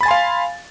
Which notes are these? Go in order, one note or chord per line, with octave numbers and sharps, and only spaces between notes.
F5 G#5 B5 C6 A6